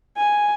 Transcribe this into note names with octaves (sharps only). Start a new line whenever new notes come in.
G#5